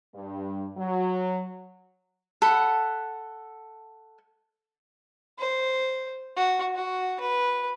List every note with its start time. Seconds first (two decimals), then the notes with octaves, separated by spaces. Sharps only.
0.14 G2
0.76 F#3
2.42 A4 F#5 B5
5.38 C5
6.36 F#4
6.75 F#4
7.20 B4